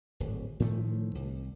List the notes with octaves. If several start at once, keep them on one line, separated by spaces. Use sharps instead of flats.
D1 G#1
A2 D#3 F3 A3
C2